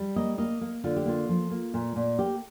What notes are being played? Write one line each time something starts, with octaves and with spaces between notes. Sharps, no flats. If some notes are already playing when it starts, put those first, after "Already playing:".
Already playing: G3
A#3 D#5
A#3 D#5
A#3
D3 F4
G4
A#3 F4
F3
A#3
A#2
A#2
A#3 G4